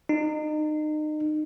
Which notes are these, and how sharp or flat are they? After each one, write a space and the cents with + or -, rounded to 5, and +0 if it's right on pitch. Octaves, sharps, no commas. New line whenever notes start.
D#4 -30